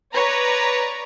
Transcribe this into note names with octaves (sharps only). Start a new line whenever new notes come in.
B4 C#5 D5 A#5